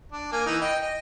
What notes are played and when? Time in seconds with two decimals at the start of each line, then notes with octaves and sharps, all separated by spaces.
0.12 D4
0.32 A#3 G#5
0.46 E3 D#4
0.61 D#5 G5
0.82 D#5